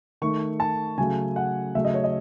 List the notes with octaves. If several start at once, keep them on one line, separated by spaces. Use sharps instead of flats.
D#3 A3 C#6
A5
C#3 F#3 A3 G#5
F#5
C#3 F#3 A3 E5
D#5
C#5
D#5